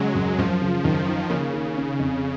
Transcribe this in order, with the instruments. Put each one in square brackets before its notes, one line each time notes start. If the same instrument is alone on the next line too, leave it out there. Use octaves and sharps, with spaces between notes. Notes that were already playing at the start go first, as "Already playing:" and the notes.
Already playing: [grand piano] C#3 [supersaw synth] F#3 G#3
[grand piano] F#2
[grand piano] F#2 [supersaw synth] F3
[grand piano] C#3
[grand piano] F#2 [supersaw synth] D#3
[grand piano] D#4
[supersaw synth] C#3 [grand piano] A#3
[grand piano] D#3
C#4
F2